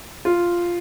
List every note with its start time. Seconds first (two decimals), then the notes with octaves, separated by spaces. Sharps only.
0.25 F4